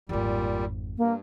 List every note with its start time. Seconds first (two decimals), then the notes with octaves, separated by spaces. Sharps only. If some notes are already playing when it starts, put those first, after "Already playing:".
0.09 G#1 F2 A#2 G3
0.98 G2 A#3